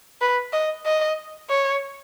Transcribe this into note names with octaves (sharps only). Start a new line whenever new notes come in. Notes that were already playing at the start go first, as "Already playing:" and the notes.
B4
D#5
D#5
C#5